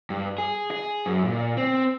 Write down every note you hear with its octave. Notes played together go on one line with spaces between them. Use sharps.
G2
G#4
G#4
F#2
A#2
C4